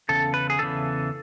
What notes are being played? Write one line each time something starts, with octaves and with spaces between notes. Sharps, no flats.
E2 C#3 A4
B4
G#4
E2 C#3 E3 A4